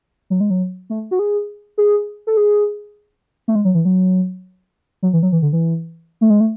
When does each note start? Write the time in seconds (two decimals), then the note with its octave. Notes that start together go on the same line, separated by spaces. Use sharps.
0.30 F#3
0.40 G#3
0.50 F#3
0.90 A3
1.11 F#4
1.19 G#4
1.78 G#4
2.27 A4
2.37 G#4
3.48 A3
3.55 G#3
3.65 F#3
3.75 E3
3.85 F#3
5.03 F#3
5.13 E3
5.23 F#3
5.32 E3
5.42 D3
5.53 E3
6.21 A3
6.30 G#3
6.40 A3